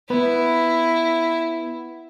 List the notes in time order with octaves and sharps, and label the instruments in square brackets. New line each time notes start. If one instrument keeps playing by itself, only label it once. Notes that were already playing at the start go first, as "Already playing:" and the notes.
[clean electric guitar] B3 B4 [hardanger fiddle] E4